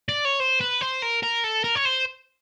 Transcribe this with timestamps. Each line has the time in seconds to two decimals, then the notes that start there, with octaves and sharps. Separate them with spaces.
0.09 D5
0.25 C#5
0.40 C5
0.61 B4
0.81 C5
1.02 A#4
1.23 A#4
1.44 A4
1.64 A#4
1.75 C#5
1.85 C5